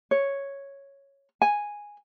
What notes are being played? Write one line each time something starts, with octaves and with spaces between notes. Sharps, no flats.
C#5
G#5